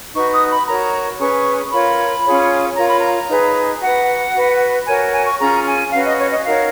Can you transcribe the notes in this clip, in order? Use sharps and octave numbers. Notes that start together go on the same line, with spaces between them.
D#4 F#4 B4 C#6
D#6
B5
F#4 A#4 C#5 A#5
C#4 G#4 B4 C#6
F4 A#4 C#5 B5
C#4 F4 G#4 C#5
F4 A#4 C#5 A#5
B5
A#5
D#4 G#4 B4
F#4 B4 F#5
F#4 B4
F#4 A#4 C#5 G#5
G#5
C#6
C#4 F4 G#4 A#5
G#5
C#4 F#4 B4 F5
D#5
C#5
D#5
D#4 F#4 A#4 C#5 F5